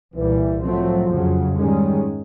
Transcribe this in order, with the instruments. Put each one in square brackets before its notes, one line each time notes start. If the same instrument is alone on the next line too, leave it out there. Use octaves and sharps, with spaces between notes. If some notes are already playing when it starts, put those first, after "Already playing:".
[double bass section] C2 A#2 G3 [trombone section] E3
[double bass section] A2 F#3 A3 C4 [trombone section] F3
[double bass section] F2 C#3 F#3
[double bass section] G#2 D#3 G#3 C#4 [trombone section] G3